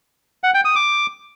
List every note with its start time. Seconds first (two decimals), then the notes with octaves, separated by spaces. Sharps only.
0.44 F#5
0.54 G5
0.65 D#6
0.76 D6